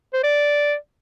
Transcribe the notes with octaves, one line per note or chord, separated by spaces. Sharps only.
C5
D5